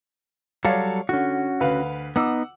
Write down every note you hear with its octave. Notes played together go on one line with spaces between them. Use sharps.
F#3 G3 A4 C#5 D5 F5
D3 C#4 F#4
D2 B4 F5
B3 D#4 F#5 D6 E6